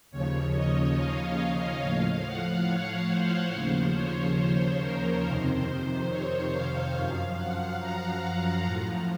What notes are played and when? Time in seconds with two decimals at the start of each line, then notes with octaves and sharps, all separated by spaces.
0.11 D#2 C#3 F3 C#5
0.54 D#5
0.96 F5
1.39 F5
1.82 A2 F3 F5
2.24 F#5
2.67 C#5
3.10 C5
3.53 D#2 C#3 F3 C5
3.95 C#5
4.38 C5
4.81 A#4
5.23 F2 C3 D#3 C5
5.66 C5
6.09 C#5
6.52 F5
6.95 F#2 F3
7.37 F#5
7.80 A#5
8.23 A#5
8.65 A2 F3